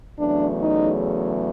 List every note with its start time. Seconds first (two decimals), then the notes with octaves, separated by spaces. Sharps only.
0.19 E2 C#3 F#3 A3 D4
0.61 D#4